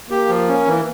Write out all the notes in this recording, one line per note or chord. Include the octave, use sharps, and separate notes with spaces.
A#3 G4
F3
C#4
E3